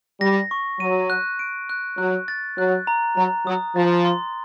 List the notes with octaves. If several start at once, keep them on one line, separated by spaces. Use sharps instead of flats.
G3 A#6
C#6
F#3 D#7
F#6
D7
F#6
F#3 F#6
A6
F#3 F#6
A#5
F#3 A#5
F#3 D#6
F3 A6
C6